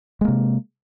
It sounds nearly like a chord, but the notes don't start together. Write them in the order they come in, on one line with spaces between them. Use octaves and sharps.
G#3 A#3 C3